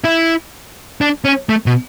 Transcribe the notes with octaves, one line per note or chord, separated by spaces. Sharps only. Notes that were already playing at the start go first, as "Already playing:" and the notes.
E4
D4
C#4
A3
B2